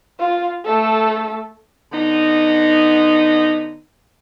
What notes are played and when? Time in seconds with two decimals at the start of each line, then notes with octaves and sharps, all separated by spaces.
0.20 F4
0.65 A3 A4
1.92 D3 B3 D#4